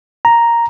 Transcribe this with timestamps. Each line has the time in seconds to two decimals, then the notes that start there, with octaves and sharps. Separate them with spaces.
0.25 A#5